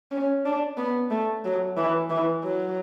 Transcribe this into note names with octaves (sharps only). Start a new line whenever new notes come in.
C#4
D4
B3
A3
F#3
E3
E3
F#3